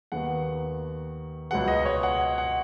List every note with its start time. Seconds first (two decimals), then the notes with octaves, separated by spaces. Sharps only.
0.12 D#2 D#3 B3 F#5
1.51 C#2 B2 F#3 B3 F#5
1.68 D#5
1.85 C#5
2.03 F#5
2.38 F#5